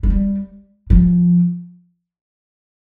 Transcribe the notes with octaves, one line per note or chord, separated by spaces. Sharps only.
A3
G3
F3